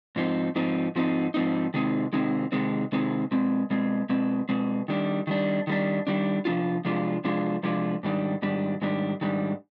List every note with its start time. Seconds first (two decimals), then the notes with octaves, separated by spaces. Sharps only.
0.16 G#2 F3 C4 D#4
0.55 G#2 F3 C4 D#4
0.95 G#2 F3 C4 D#4
1.34 G#2 F3 C4 D#4
1.74 C3 D#3 G#3 C4 D#4
2.13 C3 D#3 G#3 C4 D#4
2.52 C3 D#3 G#3 C4 D#4
2.92 C3 D#3 G#3 C4 D#4
3.31 B2 G#3 C4
3.70 B2 G#3 C4
4.09 B2 G#3 C4
4.49 B2 G#3 C4
4.88 D#3 G3 D4
5.27 D#3 G3 D4
5.67 D#3 G3 D4
6.07 D#3 G3 D4
6.45 C3 F3 G#3 D4 F4
6.85 C3 F3 G#3 D4 F4
7.24 C3 F3 G#3 D4 F4
7.63 C3 F3 G#3 D4 F4
8.03 G#2 D#3 G3 D4
8.42 G#2 D#3 G3 D4
8.81 G#2 D#3 G3 D4
9.21 G#2 D#3 G3 D4